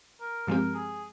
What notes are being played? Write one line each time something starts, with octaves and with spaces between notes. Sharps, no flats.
A#4
G2 F3 G#3 C4 G4 A#4
G#4